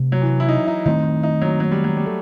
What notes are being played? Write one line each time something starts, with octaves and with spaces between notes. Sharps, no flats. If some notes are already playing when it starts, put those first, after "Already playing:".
Already playing: C3 A3
F#3
E3
E4
D#4
D#4
D#3 A3 C4 D#4
D#4
F#3
F#3
G3
F#3
G3
A3